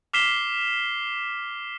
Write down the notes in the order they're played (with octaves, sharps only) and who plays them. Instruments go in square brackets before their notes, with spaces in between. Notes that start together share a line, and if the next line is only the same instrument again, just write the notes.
[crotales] D6 F6 B6 C7 E7 G7